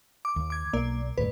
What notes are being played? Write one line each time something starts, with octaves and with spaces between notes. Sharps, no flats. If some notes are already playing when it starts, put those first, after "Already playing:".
D6
D#2
D6 G#6
B1 A#3 D5
F#1 D#2 A2 B4